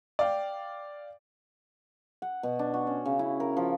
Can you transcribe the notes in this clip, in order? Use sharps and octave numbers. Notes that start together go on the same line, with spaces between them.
D5 F5 G5
F#5
B2
D4
F#4
C#4
C#3
E4
A#4
F3